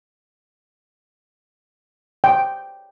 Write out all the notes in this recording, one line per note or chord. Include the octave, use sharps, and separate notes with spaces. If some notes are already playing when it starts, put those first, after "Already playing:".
G5